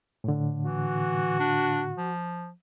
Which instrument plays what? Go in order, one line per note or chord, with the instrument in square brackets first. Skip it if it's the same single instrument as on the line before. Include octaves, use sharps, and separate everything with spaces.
[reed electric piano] A2 D3
[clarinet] E3 [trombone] F#4
[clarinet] D4
F3